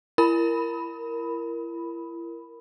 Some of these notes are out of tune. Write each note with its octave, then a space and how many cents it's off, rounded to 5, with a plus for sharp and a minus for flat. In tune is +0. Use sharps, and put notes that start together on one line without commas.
E4 +35 A#4 +0 B5 +0